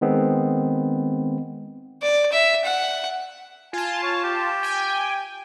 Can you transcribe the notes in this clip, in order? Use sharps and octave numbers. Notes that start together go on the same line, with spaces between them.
D#3 G#3 B3 C4
D5
E5
F#5
F4 G#5 A5
C#5
G4
G5 G#5